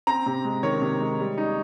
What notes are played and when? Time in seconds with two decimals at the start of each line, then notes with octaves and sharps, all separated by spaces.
0.07 C4 A#5
0.26 C3
0.45 G#3
0.63 D#3 C#5
0.82 C3
1.00 G#3
1.20 G3
1.38 D#4